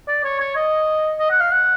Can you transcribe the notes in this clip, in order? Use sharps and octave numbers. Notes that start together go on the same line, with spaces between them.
D5
C#5
C#5
D#5
D#5
F#5
F5
F#5